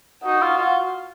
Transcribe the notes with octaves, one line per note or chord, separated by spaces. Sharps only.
D#4 F#4
F4
F4